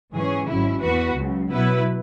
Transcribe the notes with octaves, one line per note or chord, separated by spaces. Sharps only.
G#2 E3 C#4 G#4 C#5
G#1 G#2 F#3 C#4 E4
E2 E3 B3 F#4 B4
C#2 C#3 F#3
B2 F#3 B3 E4 B4